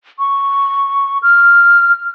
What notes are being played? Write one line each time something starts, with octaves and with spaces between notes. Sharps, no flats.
C#6
F6